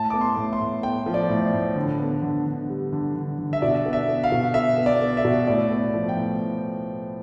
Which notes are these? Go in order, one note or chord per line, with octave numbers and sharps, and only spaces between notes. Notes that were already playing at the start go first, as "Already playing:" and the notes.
Already playing: A2 A5
B3 D6
C6
A2
C6
A2
B3 G5
F3
D5
A2
A2
D3
B3
D3
D3
G3
D3
D3
D3
E5
B2 D5
B3
E5
B3
F5
B2
B3 E5
B3
D5
B3
E5
B2
A2 D5
B3
F3
G5
A2